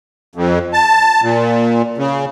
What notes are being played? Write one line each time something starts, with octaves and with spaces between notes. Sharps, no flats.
F2
A5
A#2
C#3